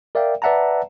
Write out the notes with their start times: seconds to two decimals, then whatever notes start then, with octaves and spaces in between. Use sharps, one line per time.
0.15 A#4 D5 E5 F5 G5
0.42 B4 D5 E5 F#5 A5 A#5